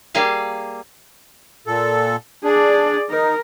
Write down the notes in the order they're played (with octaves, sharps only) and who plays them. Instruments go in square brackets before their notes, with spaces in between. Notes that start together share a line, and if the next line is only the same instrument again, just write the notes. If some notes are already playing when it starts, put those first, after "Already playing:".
[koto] G3 A#3 G#4 F5
[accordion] A#2 A4
[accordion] D4 [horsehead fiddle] G#4 D5
[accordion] D#4 [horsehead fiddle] A#4